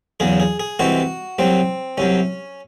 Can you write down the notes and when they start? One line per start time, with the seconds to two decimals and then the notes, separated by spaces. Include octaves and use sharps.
0.20 E2 C#3 F#3 G#4
0.40 G#4
0.60 G#4
0.79 C2 C3 E3 G#3 F#4
1.39 C2 C3 F#3 C4
1.98 C2 C3 F#3 C#4